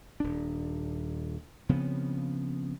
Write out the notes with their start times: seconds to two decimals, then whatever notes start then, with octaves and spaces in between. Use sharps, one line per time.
0.20 D#1 D4
1.69 C#3 F3 B3 C4